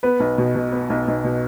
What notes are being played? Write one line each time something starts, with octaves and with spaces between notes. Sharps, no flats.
B3 B4
B1
B2
B2
B3
B1
B1
B2